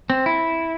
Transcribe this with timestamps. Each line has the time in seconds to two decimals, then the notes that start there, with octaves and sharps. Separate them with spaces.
0.10 C4
0.26 E4